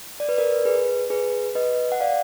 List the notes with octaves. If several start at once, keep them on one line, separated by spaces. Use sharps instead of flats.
D5
B4
A#4 D5
G#4 B4
G#4 B4
B4 D#5
F#5
D5 F5